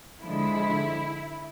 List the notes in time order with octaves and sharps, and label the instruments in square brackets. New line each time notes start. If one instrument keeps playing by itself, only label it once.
[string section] D3 F3 G#3 E4